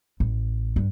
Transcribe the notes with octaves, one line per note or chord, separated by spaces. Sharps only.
A1
G2